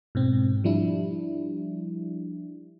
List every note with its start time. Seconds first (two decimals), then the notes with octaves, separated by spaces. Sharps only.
0.15 G#2 B2 C4
0.64 F3 G3 D4 E4